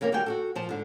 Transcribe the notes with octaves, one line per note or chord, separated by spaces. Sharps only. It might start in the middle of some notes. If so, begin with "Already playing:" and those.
C3 E3 A#3 C#4 A#4
D#3 G3 F#4 A#4 G5 G#5
F#4 G4 A4
A#2 F3 A5
G#2 D3